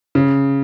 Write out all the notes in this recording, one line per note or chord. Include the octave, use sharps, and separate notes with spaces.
C#3